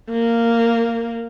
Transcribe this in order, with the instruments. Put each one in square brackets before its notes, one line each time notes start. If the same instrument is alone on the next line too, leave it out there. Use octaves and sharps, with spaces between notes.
[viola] A#3